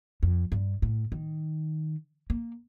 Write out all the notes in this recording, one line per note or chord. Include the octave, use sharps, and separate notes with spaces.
F2
G2
A2
D#3
A#3